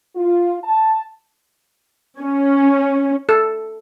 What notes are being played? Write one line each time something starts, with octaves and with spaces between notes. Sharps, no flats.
F4
A5
C#4
A4